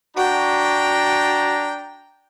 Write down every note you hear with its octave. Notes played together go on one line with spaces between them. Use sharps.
D4 F#4 G5 A#5